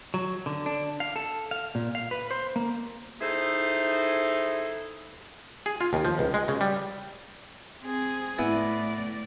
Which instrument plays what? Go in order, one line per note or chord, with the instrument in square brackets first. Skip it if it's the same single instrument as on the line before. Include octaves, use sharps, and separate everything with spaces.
[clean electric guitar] F#3
D3
D4
F5
A4
F5
A#2
F5
B4
C5
A#3
[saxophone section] D#4 E4 G#4 A4 C5
[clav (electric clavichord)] G#4
F4
D#2
F3
C#2
G#3
C#3
G3
[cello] C4 G#4
[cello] A2 D5 [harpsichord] B3 E4 G#5